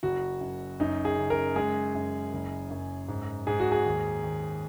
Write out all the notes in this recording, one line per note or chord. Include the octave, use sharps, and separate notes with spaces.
F#1 F#4
F#2
F#2 D#4
G#4
C#3
A#4
G#3 G#4
F#2
F#1
F#2
G#2
G#2 G#4
F#4
G#4
D#2
D#2